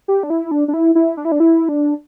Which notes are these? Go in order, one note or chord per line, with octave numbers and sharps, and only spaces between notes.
G4
D4
E4
D4
D4
E4
E4
D4
E4
D4
E4
D4